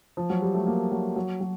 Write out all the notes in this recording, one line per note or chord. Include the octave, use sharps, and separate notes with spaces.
F3
F#3
G3
A3
A#3
F#3
F#3
F#3